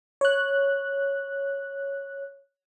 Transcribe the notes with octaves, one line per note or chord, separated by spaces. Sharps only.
C#5 F#6